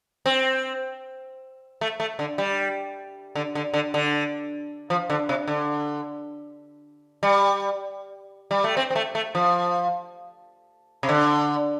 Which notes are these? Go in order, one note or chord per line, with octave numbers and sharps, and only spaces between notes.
C4
A3
A3
D3
G3
D3
D3
D3
D3
F3
D3
C3
D3
G3
G3
A3
C4
C4
A3
A3
F3
C3
D3